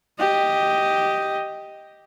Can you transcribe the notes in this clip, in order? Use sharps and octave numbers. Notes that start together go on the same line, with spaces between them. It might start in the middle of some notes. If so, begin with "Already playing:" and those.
G4 D#5